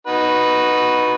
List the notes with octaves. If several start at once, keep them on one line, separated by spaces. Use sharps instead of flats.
D#4 F#4 B4